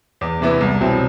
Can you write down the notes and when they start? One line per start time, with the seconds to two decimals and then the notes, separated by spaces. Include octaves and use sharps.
0.21 E2
0.40 C3 E3 B3 E4
0.61 C2
0.81 B2 F#3 C4 E4